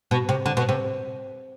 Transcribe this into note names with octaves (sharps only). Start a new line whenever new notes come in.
B2
C3
D3
B2
C3